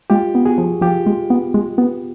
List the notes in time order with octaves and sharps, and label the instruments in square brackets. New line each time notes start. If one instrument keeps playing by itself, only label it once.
[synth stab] G#3 [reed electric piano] F4 G4
[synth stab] B3
[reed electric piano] F#4 G#4
[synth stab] F3
[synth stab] F3 [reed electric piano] F4 G4
[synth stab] G#3
B3
G#3
B3